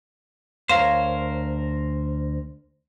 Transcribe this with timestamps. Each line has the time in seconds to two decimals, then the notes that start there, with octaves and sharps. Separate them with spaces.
0.69 D2 A#4 C5 C#5 F5